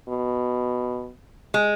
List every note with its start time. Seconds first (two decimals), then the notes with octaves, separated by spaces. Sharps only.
0.09 B2
1.54 G#3